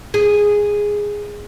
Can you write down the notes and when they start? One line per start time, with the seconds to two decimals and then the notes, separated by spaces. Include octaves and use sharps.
0.14 G#4